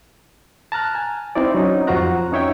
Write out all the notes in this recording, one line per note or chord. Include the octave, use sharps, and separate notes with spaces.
A5 A#5 F6 F#6
G#5
C4 D#4 E4 D5
F#3 C#4 D#4
F2 F4 F#4 C5 A#5 F#6
C#4 D#4 C#5 E5 G5